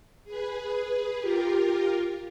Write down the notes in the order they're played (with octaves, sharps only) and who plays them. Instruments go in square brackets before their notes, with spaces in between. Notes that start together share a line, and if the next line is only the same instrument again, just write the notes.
[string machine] G#4 B4
F4 G4 A#4